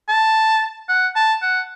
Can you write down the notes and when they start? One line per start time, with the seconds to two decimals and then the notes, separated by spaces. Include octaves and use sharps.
0.08 A5
0.89 F#5
1.16 A5
1.42 F#5